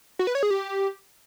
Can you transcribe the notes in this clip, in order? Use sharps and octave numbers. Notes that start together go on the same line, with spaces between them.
F#4
B4
C#5
G#4
G4